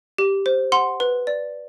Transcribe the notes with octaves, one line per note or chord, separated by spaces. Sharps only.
G4
C5
F#5 C6
B4
D5